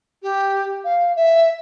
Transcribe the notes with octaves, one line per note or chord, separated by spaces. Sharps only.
G4
F5
E5